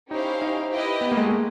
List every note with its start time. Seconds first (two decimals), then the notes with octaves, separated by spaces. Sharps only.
0.11 C#4 D#4 E4 G4 C5 F5
0.42 D#4
0.72 E4 G4 B4 D#5
1.01 B3
1.12 A#3
1.17 G#3
1.22 A3
1.31 A#3